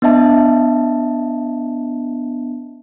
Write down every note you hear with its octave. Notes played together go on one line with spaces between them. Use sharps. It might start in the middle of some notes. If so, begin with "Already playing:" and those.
B3 D4 D#5 E5 A5